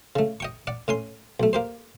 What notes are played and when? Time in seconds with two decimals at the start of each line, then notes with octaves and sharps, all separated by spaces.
0.16 C#3 A3
0.40 D#5 G5 C#6
0.67 D5 F#5
0.88 A2 C#4 G#5 C6
1.40 B1 A3
1.53 A#3 G4 C5